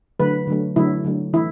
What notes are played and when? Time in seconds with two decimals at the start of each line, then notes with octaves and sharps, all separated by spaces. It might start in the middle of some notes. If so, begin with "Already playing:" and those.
0.19 D3 F#3 A3 B4
0.47 D3 F#3 A3
0.76 D3 F#3 A3 E4
1.04 D3 F#3 A3
1.33 E3 A3 E4